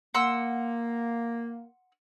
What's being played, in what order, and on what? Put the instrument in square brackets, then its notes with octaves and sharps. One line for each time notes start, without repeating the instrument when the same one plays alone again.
[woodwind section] A#3 [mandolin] F#5 C6 E6